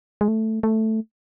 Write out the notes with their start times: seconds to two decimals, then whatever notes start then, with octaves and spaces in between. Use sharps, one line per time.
0.21 G#3
0.28 A3
0.63 A3